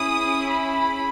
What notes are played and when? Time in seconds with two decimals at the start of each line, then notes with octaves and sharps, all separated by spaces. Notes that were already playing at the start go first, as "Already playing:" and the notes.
Already playing: C#4 E4 G#4 D#6
0.47 B5